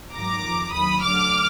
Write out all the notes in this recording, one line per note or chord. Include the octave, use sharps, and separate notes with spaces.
G#2 D#3 F#3 A#5 D6
F2 F3
D#2 D#3 F#3 B5 D#6
D2 D3 F#3 D6 F6